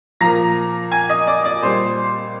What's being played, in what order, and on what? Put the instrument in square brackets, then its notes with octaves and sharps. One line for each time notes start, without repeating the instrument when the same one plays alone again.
[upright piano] A#2 F3 A#5 A#6
G#5 G#6
D#5 D#6
D5 D6
D5 D6
A#2 G3 C5 C6